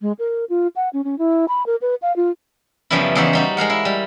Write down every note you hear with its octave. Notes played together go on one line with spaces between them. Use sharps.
G#3
A#4
F4
F#5
C#4
C#4
E4
B5
A#4
B4
F5
F4
F#2 C#3 F3 G3 B3 E4
E2 C#3 D#4 C5 E5 F#5
G3 D#4 F#4
G#3 A#4 F5 F#5
E4
G3